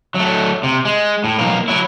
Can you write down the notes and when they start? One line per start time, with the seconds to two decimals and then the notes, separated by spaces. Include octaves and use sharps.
0.15 F#3 A3
0.63 C3
0.85 G#3
1.24 A2
1.39 B1 A#3
1.68 F#3 E4